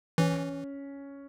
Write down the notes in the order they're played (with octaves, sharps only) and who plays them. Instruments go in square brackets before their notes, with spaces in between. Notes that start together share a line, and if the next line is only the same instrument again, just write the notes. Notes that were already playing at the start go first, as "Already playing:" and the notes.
[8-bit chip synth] E3 [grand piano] C#4